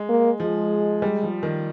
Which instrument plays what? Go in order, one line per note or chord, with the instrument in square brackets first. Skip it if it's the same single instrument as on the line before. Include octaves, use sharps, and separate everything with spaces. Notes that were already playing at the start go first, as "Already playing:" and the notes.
Already playing: [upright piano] G#3
[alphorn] A#3
[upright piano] F3 [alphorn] G#3
[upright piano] G3
F3
D#3